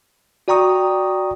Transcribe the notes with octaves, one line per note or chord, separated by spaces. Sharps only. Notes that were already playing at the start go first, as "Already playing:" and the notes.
F#4 D5 G5 A#5 C#6 D#6